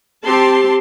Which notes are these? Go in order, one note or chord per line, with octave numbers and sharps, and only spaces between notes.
C4 G4 A5 C6